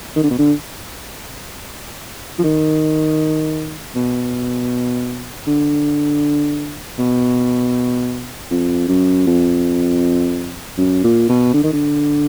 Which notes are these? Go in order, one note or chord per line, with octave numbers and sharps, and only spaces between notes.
D#3
D3
B2
D3
F3
D#3
B2
D3
B2
F2
F#2
F2
F#2
A#2
B2
D3
D#3
D3